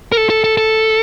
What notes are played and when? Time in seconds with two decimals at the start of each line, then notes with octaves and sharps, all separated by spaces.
0.12 A#4
0.17 A4
0.30 A4
0.44 A4
0.57 A4